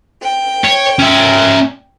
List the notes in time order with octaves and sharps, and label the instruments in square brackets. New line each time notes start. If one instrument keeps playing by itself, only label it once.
[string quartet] G5
[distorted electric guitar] C#5
C#4 E5